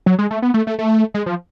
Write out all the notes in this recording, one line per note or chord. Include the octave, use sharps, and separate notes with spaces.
F#3
G#3
A3
B3
A3
A3
A3
G#3
F3